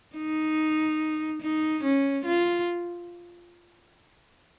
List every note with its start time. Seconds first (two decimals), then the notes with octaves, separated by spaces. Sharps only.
0.16 D#4
1.41 D#4
1.83 C#4
2.25 F4